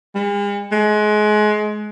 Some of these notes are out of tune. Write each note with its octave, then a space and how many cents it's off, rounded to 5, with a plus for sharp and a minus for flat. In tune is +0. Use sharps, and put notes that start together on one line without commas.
G#3 -45
G#3 +25